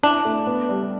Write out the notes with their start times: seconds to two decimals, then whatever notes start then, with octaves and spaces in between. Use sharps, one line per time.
0.03 D4 E4
0.25 A3
0.47 B3
0.69 G3